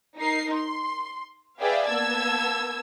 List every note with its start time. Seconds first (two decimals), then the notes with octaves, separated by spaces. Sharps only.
0.18 D#4 A#4 C7
0.53 C6
1.60 G#4 B4 D5 E5 F5 G5
1.88 A#3 B3 A5 E6 G#6